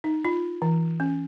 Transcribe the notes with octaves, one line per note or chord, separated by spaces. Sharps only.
D#4
F4
E3
C#4